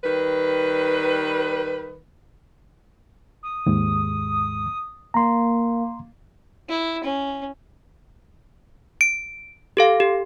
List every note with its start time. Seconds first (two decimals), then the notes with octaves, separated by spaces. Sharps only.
0.04 D#3 G3 B4
3.43 D#6
3.66 D#2 G#2 G#3
5.14 A#3 A#5 C6
6.69 E4
7.04 C#4
9.01 D7
9.77 G4 A4 F5
10.00 G4